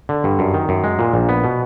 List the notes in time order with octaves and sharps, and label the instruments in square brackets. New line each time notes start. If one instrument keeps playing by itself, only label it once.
[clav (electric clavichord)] D3
G2
F#2
D#3
F#2
G#3
A#2
A#1
B3
B2